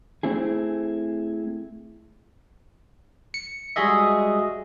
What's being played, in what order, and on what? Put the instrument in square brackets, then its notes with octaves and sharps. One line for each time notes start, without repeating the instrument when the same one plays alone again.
[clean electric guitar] A3 C4 E4 G#4
[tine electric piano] C#7
G3 G#3 F#4 G#4 D#5 E5